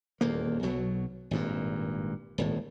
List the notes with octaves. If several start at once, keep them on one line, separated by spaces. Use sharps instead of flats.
D#1 E2 A#3
B1 B2 F#3
G#1 G2 A#2
D#1 G#1 A2